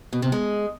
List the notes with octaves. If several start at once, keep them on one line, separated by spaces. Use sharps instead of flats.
B2
C3
G#3